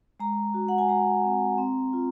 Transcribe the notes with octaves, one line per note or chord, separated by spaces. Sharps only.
G#3 A#5
F#4
F#5
G#5
G#3 A#5
C4
C4
F4